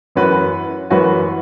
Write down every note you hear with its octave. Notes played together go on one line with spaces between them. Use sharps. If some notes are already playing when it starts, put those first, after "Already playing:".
F#2 E3 C#4 F#4 B4
F#2 E3 C#4 F#4 B4